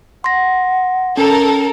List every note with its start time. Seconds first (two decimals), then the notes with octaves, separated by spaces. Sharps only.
0.24 F#5 C6 A#6
1.17 C#4 A4 A#4